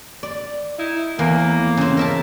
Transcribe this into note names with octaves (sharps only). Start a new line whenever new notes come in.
D5
D#4 E4
E2 A2 A#3
C#3 C4
A#4 E5 A5